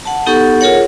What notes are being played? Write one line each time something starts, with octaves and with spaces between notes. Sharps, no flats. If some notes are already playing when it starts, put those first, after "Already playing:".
F#5 A5
B3 D#4 G4 A4 F#5 C#6
F4 G#4 A#4 C#5 F#5